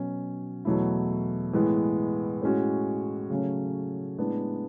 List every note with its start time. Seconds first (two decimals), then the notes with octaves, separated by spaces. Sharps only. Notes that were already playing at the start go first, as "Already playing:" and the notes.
Already playing: B2 F#3 C#4
0.65 E2 B2 F#3 A3 E4
1.53 A2 E3 G#3 B3
2.42 A2 G#3 C#4 F#4
3.30 C#3 F#3 A3 C#4
4.18 A2 G#3 B3 D4